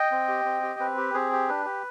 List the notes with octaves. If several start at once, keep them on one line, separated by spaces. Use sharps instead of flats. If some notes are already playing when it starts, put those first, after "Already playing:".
Already playing: D#5 G5
C4
G4
C4
G4
C4 B4
G4
C4 G#4
G4
D4 B4
G4